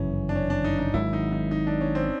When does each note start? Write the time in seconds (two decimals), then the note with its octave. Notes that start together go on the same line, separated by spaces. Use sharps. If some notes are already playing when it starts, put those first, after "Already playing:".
Already playing: G1 F#2 C#3 E3 C#4
0.29 D4
0.36 C#4
0.50 D4
0.64 D#4
0.79 D#4
0.94 G#1 G#2 D#3 F#3 E4
1.13 D#4
1.32 D#4
1.51 D#4
1.67 D4
1.81 C#4
1.95 C4